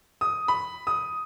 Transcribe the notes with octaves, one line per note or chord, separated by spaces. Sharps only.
D#6
B5
D#6